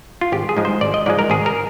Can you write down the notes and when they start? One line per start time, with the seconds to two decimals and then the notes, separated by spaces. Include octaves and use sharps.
0.21 F4
0.32 G#1 G4
0.49 G#4
0.57 G#2 F3 G#3
0.65 C5
0.81 G#1 D5
0.94 D#5
1.06 G#2 F3 G#3 D5
1.19 A#4
1.30 G#1 G#4
1.46 A#4